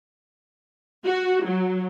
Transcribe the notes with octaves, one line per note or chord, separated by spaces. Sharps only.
F#4
F#3